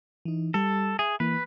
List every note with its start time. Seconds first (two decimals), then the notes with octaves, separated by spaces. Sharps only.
0.25 E3 D#4
0.54 G3 G4 A4
0.99 G#4 E5
1.20 E3 A#3 B4